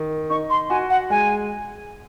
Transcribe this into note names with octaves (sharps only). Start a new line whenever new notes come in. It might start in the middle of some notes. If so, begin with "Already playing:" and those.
Already playing: D#3
D#4 C#6
C6
F#4 G#5
F#5
G#3 G#5